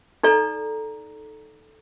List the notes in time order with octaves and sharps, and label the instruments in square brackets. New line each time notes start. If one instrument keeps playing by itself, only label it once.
[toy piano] D#4 A4 D5 A#5